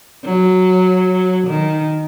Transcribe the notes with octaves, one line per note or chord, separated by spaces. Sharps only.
F#3
D#3